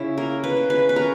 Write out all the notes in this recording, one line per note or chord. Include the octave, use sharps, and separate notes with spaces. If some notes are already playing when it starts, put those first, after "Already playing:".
Already playing: C#3 C#4 E4
A#3 A#4
B4
C#3
B4
B4
C#4 A#4